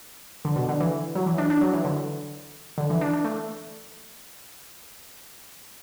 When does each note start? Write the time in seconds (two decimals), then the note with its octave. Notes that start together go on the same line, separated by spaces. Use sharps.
0.45 D3
0.56 B2
0.69 D3
0.80 E3
1.15 F#3
1.26 E3
1.38 D4
1.50 D4
1.61 F#3
1.73 E3
1.85 D3
2.78 D3
2.90 E3
3.01 D4
3.13 D4
3.24 A3